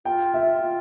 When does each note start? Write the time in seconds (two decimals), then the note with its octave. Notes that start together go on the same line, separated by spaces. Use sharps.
0.05 F4 G5
0.34 E5
0.61 F4